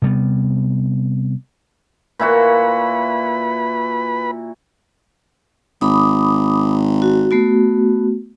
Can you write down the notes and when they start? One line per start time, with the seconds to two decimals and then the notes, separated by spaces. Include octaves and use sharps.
0.02 C3 G3 B3
2.20 A#2 E4 F#4 B4 B5
5.81 G#1 B5 D6 D#6
7.02 F#4
7.31 A3 B3 F#4